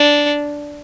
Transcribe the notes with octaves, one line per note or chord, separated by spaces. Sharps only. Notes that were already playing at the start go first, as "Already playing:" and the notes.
Already playing: D4